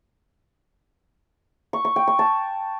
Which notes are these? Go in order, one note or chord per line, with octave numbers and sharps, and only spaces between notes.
C#6
C#6
G5
C#6
A5